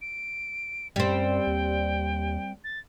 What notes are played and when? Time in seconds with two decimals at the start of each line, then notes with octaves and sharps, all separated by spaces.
0.01 D7
0.96 F#2 G3 C4 G5
1.47 D#2
2.64 A6